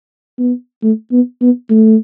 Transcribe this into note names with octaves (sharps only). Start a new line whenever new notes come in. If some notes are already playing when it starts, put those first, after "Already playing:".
B3
A3
B3
B3
A3